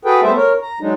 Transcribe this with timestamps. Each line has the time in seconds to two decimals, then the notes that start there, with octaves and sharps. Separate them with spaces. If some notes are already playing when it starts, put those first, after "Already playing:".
0.05 F#4 G#4 A4 B4 G5
0.23 G3 A3 B3 A4 C5 E5
0.36 A#4 C#5
0.62 A#5
0.81 F#3 G#3 D4 D#4